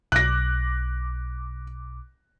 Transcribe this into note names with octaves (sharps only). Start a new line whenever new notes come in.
B1 D6 F#6 A#6